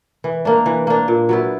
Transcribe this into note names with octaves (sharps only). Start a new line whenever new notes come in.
E3
A#3 D4
E3
A#3 D4
A#2
F#3 B3 E4